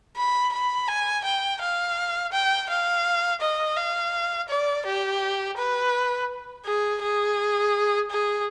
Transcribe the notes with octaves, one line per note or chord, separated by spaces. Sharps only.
B5
B5
G#5
G5
F5
G5
F5
D#5
F5
D5
G4
B4
G#4
G#4
G#4